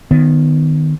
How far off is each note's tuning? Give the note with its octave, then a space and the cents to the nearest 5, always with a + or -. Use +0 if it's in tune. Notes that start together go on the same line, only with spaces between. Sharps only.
D#3 -15 B3 +10